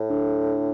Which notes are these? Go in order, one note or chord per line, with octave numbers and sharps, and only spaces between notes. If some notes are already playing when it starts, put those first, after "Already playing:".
Already playing: A2
D3